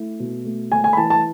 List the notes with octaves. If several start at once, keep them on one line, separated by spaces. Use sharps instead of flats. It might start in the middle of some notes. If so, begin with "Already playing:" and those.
Already playing: A3 E4
B2
A3
A3 G#5
G#5
B5
E3 A5
A5